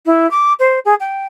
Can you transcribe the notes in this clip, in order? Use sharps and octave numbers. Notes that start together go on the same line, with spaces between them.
E4
D6
C5
G#4
G5